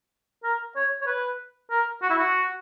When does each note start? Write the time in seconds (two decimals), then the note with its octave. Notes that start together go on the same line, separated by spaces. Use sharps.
0.44 A#4
0.76 C#5
1.01 C#5
1.07 B4
1.71 A#4
2.02 F#4
2.10 E4
2.18 F#4